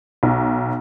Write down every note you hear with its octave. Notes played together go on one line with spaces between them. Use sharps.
B1